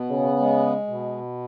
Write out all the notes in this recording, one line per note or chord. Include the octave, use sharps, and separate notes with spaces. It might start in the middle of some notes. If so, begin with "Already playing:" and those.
Already playing: B2 B3
C#3
G#3
B2